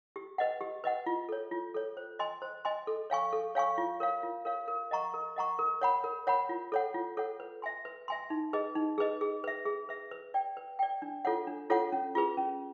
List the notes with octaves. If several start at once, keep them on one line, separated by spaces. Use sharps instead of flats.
G4
B4 D#5 F#5
G4
B4 D#5 F#5
F4
A4 C#5
F4
A4 C#5
C5
D#5 G#5 C6
C5
D#5 G#5 C6
A4
C#5 F5 G#5 C#6
A4
C#5 F5 G#5 C#6
F4
A#4 C#5 F5
F4
A#4 C#5 F5
A#4
D#5 F#5 A#5 C#6
A#4
D#5 F#5 A#5 C#6
A#4
C#5 F#5 B5
A#4
C#5 F#5 B5
F4
A4 C#5 F#5
F4
A4 C#5 F#5
B4
E5 G#5 C6
B4
E5 G#5 C6
D#4
G#4 B4 D#5
D#4
G#4 B4 D#5
G#4
B4 E5
G#4
B4 E5
B4
D5 G5
B4
D5 G5
D4
F4 A4 C#5 F#5
D4
F4 A4 C#5 F#5
C#4
F4 G#4 B4
C#4